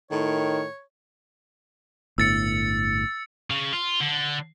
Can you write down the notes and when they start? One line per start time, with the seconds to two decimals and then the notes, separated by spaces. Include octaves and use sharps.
0.11 A2 D#3 C#5
2.18 G1 A2 E6 A6 C#7
3.50 C#3
3.73 F4
4.01 D3